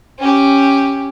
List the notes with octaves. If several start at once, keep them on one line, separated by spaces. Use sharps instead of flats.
C#4 G4